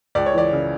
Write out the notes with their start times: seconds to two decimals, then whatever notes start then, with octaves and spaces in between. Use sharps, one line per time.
0.15 C#2 D5
0.26 C#5
0.33 E3 D5
0.52 C#3